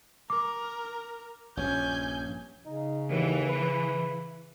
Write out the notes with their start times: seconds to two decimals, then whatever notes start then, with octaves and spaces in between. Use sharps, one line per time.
0.30 A#4 D6
1.57 A#1 G2 C#4 C#5 G#5 G6
2.66 C#3 D#4
3.10 D#2 E3
3.49 B4